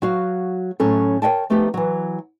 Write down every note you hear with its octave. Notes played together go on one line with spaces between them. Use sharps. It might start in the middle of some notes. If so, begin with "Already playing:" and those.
F#3 F#4 F5
A2 F#3 C#4 A4
A#4 C#5 E5 G5 A5
F3 A3 B3 D#4 G4
E3 F#3